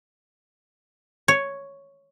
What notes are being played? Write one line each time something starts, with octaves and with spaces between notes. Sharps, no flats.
C#5